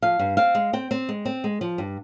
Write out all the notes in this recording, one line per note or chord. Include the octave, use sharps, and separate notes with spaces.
F3 F5
G2
C4 F5
G#3
C4 G5
C4
G#3
C4
G#3
F3
G2